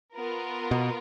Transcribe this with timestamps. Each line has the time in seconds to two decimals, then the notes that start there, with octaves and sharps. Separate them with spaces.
0.14 B3 F4 A#4
0.71 B2